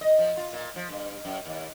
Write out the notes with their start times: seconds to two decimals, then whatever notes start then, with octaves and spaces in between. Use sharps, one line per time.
0.01 D#5
0.19 F3
0.37 F4
0.53 A#2
0.76 F3
0.89 G2
1.25 F#2
1.45 D#2